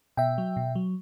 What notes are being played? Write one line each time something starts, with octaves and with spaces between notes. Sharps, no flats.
B2 E5 G5
F#3
B2
F#3